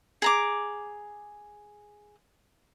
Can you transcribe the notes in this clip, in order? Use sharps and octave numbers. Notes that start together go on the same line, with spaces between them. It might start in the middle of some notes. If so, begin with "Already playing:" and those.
G#4 A#5 D6